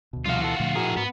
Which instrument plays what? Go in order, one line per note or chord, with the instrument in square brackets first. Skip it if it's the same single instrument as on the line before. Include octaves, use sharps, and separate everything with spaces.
[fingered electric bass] D2 B2
[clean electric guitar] C2 F3 F5 [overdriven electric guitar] F4 F#4
[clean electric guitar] E3 A4
[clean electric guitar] D2 [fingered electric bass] A#2 F3
[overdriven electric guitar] A2 G#4 [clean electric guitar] F#4 A#4
[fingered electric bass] G#2 [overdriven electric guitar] B3